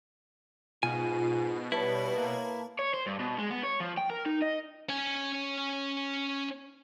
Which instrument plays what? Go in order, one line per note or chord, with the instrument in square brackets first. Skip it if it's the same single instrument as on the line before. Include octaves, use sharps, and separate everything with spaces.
[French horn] G#2 [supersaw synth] B2 [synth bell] F4 [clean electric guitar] G#5
[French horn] G3 [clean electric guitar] E4 [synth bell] B4 C#5 A5
[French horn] A#3
[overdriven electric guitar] C#5
C5
G2
B2
G#3
B3
C#5
F3
G5
A#4
D#4
D#5
[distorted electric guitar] C#4 G#5